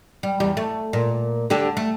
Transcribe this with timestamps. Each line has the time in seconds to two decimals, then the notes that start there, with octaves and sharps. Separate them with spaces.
0.23 G3
0.40 E2 G3
0.57 A3
0.93 A#2
1.50 D3 G4 A4
1.77 A3